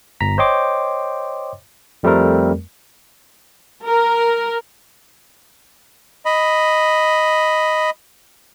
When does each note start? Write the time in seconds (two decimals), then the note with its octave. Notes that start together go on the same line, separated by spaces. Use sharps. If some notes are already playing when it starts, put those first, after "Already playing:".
0.20 G1 A#5 B6
0.38 C5 C#5 D#5 G5 C6 D6
2.03 F2 G3 A3 C4 A#4
3.86 A#4
6.26 D#5 B5